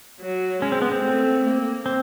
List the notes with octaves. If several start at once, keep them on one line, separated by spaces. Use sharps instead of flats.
F#3
G#3 C#4
C4
B3
C4
A3
A#3
C4